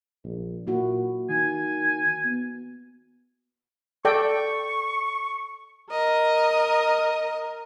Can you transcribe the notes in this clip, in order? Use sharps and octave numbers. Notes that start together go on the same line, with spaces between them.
A#1
A#2 A#3 E4 F#4
D#3 G#5
B3
A4 D5 G5 C#6
A#4 D#5